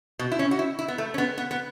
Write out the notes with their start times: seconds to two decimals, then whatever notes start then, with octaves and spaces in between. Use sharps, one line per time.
0.19 B2
0.32 E4
0.39 C#4
0.51 F#4
0.59 E4
0.79 E4
0.88 B3
0.98 A3
1.14 C#4
1.18 B3
1.38 B3
1.51 B3